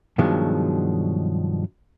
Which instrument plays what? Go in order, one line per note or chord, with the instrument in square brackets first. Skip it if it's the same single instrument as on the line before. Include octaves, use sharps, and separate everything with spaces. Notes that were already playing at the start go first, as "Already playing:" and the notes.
[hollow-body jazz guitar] G2 B2 D#3 F3 F#3 G#3